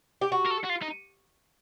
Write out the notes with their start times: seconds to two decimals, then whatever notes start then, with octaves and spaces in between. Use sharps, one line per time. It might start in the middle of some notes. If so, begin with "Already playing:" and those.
0.21 G4
0.32 F#4
0.45 A#4
0.50 A4
0.64 F#4
0.69 F4
0.82 D#4